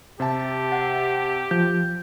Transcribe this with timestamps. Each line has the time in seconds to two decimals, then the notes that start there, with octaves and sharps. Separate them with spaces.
0.20 C3 G4 E5 A5
0.72 F#5
1.51 F3 G6